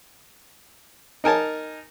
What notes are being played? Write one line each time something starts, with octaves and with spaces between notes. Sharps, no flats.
D#4 A#4 G#5 A5